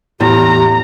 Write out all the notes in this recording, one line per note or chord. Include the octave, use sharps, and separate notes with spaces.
E2 A2 G4 A#5